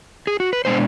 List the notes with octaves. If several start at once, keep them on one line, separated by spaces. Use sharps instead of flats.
G#4
F#4
B4
B2 G#3 B3 D4 C5